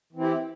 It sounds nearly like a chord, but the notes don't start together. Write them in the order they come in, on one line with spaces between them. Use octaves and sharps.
E3 C4 E4 G4